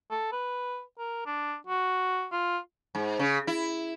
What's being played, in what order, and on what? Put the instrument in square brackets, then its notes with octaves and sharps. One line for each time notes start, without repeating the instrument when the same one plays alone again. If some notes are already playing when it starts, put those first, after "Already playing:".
[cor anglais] A4
B4
A#4
D4
F#4
F4
[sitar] G#2
C#3
E4